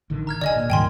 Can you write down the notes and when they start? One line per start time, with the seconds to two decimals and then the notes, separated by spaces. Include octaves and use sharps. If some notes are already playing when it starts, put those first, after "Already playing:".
0.10 A1 D3 D#3
0.27 A#5 F6 G#6
0.41 E1 D3 D5 D#5 G#5
0.55 A#2
0.70 D#1 G#2 D#3 G5 G#5 C6